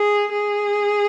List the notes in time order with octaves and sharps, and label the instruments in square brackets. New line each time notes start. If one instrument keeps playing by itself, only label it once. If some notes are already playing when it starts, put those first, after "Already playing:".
Already playing: [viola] G#4
G#4